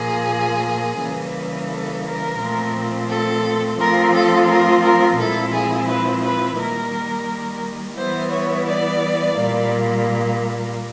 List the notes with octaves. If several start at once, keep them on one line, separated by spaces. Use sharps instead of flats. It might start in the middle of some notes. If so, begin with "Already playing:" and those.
Already playing: A#2 F3 A#3 G#4
C#3 E3 G3 A#3
A4
A#4
A#2 F3 A3 C4
A4
F3 A3 C4 F4 A#4
A4
A#4
A#4
A#2 F3 G#3 C4 E4 A4
G#4
B4
B4
D#3 G3 A#3 A#4
E3 G3 B3 E4 C5
C#5
D5
A#2 G3 A#3